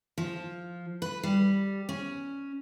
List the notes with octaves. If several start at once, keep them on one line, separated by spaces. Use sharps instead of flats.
F3
B4
G3
C#4